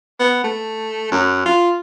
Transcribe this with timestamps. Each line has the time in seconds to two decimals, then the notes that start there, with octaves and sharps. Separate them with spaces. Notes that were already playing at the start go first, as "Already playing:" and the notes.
0.20 B3
0.44 A3
1.12 F#2
1.46 F4